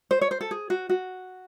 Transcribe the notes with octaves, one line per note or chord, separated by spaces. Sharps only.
C5
C#5
C5
A4
G#4
F#4
F#4